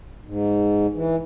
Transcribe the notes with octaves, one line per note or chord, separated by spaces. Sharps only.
G#2
E3